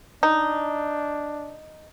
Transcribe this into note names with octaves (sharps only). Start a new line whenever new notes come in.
D4 D#4